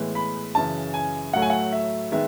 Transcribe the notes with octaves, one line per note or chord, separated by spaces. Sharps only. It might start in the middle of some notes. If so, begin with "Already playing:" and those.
Already playing: A2 E3 G#3 B3
B5
F#2 C#3 E3 A5
G#5
A2 F#3 A3 F#5
G#5
F#5
E5
D#3 G#3 B3 E5